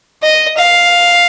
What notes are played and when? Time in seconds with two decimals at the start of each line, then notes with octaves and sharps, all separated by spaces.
0.23 D#5
0.57 F5